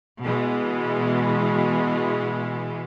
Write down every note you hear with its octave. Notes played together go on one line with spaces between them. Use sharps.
B2 E3 G#3